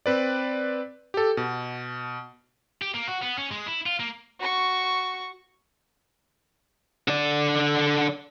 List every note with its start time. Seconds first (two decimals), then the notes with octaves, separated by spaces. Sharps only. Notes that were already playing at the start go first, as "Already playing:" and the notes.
0.06 C4 B4 D5
1.14 G4 A4
1.37 B2
2.81 G4
2.94 A#3
3.08 F#4
3.22 B3
3.38 C#4
3.51 G#3
3.67 E4
3.86 F4
4.00 A#3
4.39 F#4 C#6
7.08 D3 D5